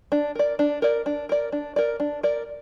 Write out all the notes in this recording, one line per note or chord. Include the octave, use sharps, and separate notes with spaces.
D4
A#4 D5
D4
A#4 D5
D4
A#4 D5
D4
A#4 D5
D4
A#4 D5